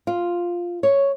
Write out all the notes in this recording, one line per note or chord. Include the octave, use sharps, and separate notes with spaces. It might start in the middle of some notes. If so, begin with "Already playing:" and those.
F4
C#5